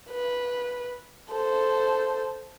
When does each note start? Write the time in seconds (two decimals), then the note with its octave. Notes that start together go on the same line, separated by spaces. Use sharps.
0.11 B4
1.31 A4 C5